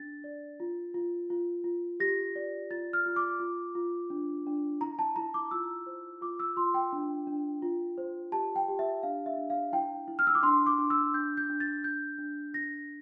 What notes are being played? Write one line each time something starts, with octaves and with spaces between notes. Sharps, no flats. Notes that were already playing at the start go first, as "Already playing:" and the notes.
Already playing: D4 A6
D5
F4
F4
F4
F4
G4 A#6
D5
F4 A6
F6
F4
D6
F4
F4
D4
D4
E4 A#5
A5
E4 A#5
D6
F4 E6
C5
F4 D6
E6
F4 C6
G5
D4
D4
F4
C5
G4 A5
G5
G4
E5
D4 F5
E5
D4
F5
E4 G5
E4
F6
E6
D6
D4 C6
D6
D4
E6
D4 G6
G6
D4
A6
D4 G6
D4
D4 A#6